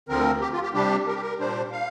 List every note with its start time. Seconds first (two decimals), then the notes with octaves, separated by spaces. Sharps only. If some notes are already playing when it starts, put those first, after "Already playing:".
0.09 D2 D3 F3 C4 A#4
0.41 G4
0.52 F4
0.62 G4
0.73 C3 G3 D4 G4
1.07 A#4
1.14 G4
1.22 A#4
1.39 A#2 G3 D4 C5
1.72 F5